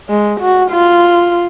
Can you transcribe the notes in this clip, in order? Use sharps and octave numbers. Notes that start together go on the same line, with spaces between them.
G#3
F#4
F4